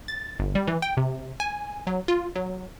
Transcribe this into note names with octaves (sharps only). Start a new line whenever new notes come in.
A6
G1
G3
E3
G5
C3
G#5
F#3
F4
F#3